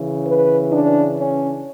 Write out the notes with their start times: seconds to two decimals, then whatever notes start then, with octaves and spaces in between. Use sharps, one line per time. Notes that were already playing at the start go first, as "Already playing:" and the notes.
Already playing: C#3 E3
0.26 B4
0.72 D4
1.18 C#4